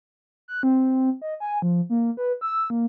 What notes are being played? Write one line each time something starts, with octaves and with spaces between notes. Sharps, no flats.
F#6
C4
D#5
G#5
F3
A#3
B4
E6
A#3